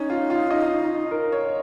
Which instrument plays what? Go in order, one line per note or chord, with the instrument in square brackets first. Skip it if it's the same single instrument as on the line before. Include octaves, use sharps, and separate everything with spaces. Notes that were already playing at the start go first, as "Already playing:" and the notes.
Already playing: [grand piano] C#4 [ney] D#4
[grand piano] F4
F4
D#5
A#4
C#5